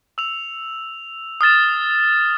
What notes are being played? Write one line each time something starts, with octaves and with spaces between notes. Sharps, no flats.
E6 F7
D#6 F6 A6 E7